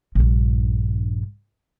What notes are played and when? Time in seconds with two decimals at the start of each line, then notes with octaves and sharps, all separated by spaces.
0.15 A#1 G2